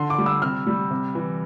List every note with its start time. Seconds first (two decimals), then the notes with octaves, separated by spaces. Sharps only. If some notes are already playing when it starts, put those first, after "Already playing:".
Already playing: D3 C6
0.10 D6
0.18 G3
0.26 E6
0.42 C3 F6
0.67 G3
0.91 C3
1.15 E3